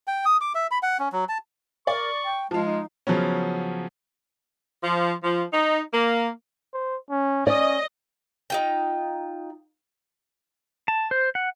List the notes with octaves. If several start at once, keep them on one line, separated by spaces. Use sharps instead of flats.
G5
D#6
D6
E5
B5
F#5
C#4
F#3
A5
A#4 D5 C#6
G5
F3 G#3 F4 A5
D#4
C#3 F3 F#3 B3 C#4
F3
F3
D#4
A#3
C5
C#4
C#4 D5 D#5
D#4 F4 G5
A5
C5
F#5